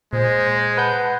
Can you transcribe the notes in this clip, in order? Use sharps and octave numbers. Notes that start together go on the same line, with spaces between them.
A#2 G#3 C5
B4 F#5 A5 G6